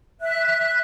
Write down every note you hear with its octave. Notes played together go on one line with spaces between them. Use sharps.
E5 F#6